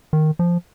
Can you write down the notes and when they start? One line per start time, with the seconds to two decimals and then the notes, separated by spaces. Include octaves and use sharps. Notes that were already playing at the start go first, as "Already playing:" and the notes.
0.13 D#3
0.39 F3